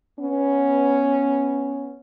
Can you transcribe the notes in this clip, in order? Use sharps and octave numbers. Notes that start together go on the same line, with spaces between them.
B3 C#4